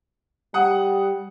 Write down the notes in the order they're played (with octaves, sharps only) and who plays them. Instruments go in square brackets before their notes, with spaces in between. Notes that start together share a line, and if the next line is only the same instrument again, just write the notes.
[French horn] G3 [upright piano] F#5 D#6